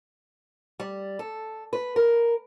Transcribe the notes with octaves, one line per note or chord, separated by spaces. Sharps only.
G3
A4
B4
A#4